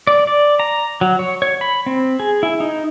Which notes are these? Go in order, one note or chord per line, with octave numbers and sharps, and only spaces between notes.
D5
D5
A#5
F#3
C#5
C#5
B5
C4
G#4
E4
D#4